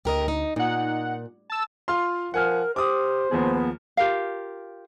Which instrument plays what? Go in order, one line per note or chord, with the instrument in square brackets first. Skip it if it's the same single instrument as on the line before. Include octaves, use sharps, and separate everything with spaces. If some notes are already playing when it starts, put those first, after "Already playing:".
[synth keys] D2 [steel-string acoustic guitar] G4 A#4 D#5
[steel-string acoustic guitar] D#4
[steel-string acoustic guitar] A#2 [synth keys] D#4 F#5
[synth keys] A5 E6
[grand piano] F4 F5 C6
[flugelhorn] F3 [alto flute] A#4 [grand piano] F#5 G#5 F6
[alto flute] G4 [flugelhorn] C5 [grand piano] D6 D#6
[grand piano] D#2 F3 G#4 [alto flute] B3
[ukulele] F4 G4 A#4 F5